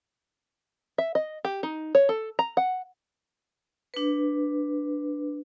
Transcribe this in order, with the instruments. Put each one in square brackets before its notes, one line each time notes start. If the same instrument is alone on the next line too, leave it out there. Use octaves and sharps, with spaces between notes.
[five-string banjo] E5
D#5
G4
D#4
C#5
A4
A#5
F#5
[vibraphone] D4 B4